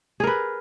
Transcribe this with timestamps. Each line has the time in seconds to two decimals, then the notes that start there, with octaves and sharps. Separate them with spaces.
0.20 G#4
0.24 A#4
0.27 B4